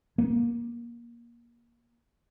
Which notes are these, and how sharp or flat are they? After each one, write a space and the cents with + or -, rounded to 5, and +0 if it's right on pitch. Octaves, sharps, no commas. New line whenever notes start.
A#3 +20